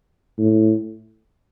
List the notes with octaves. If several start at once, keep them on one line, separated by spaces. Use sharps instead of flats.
A2